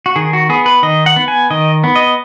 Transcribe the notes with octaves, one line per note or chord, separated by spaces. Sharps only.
F#4
D#3 G#4
F#4
B3 G#4
B4
D#3 D#5
F#5
B3
G#5
D#3 D#5
B3
D#5